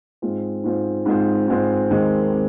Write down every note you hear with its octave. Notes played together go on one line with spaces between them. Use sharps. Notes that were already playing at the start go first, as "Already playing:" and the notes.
G#2 G#3 C4 F4 C5
G#2 G#3 C4 F4 C5
G#2 G#3 C4 F4 C5
G#2 G#3 C4 F4 C5
D#2 D#3 G#3 C4
C4